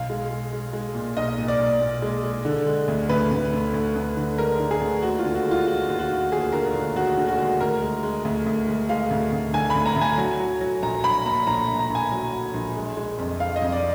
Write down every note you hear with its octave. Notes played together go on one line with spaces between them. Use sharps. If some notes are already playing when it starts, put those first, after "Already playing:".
Already playing: B1 F5
G#3
G#3
G#3
G#3
A#2
B1 D#5
A#2
D5
B1
A#2
G#3
G#3
D3
G#3
D2
D2 B4
D2
D2
D2
D2
D3
G#3 A#4
D3
G#4
D2
D#2 F#4
F4
D3
F#4
G#3
F4
G#3 F#4
D#2
F#4
D#2
D#2 G#4
D3 A#4
D#2
D#2 F#4
D3
F#4
G#3
D2 A#4
G#3
G#3
D2
D2
G#3
G#3 F5
D2
D2
D3 G#5
B5
D2
A#5
D2
G#5
F#3
F#3
F#3
A#1 A#5
A#1 B5
A#2 A#5
A#1 A#5
A#1
A#5
A#1
G#5
F#3
F#3
A#1
G#3
G#3
F2
F2 F5
D#5
F2
D5